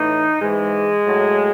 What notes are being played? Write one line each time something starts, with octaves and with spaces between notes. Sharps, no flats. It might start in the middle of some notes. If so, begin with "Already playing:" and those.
Already playing: A2 E3 D#4
G#2 E3 G#3
A2 F#3